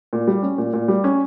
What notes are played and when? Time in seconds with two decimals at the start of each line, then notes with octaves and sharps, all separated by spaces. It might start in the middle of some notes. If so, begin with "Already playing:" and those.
0.13 A#2
0.27 G3
0.42 C#4
0.58 A#2
0.73 A#2
0.88 G3
1.04 C#4